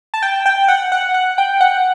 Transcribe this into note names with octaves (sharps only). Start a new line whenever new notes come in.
A5
G5
G5
F#5
F#5
F#5
G5
F#5